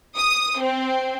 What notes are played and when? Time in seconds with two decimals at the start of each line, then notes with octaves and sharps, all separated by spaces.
0.17 D#6
0.60 C4